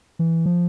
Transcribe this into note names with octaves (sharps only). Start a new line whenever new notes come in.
E3
F3